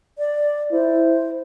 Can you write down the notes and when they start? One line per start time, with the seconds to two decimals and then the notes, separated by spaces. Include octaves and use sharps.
0.18 D5
0.72 E4 C5